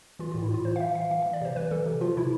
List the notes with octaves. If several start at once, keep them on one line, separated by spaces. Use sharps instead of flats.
E3 F4
F4
A2
E4
A2 F4
E3 C5
F5
E3 E5
E3 F5
E3 F5
E5
E3
D5
C3 C5
E3 B4
E3 A4
C3
F3 F4
C3 E4